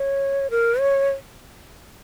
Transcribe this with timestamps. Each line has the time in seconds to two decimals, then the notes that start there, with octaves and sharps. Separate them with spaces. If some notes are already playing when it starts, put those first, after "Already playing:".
Already playing: C#5
0.50 A#4
0.79 C#5